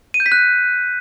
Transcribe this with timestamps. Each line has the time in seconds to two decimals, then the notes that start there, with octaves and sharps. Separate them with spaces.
0.14 D#7
0.20 G6
0.26 B6
0.32 F#6